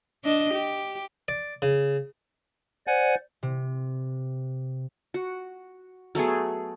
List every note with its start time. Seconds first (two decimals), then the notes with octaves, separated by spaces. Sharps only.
0.24 D4 D#5
0.54 G4
1.28 D5
1.62 C#3
2.87 C5 D5 F#5 G#5
3.43 C3
5.14 F#4
6.15 F#3 A3 B3 G#4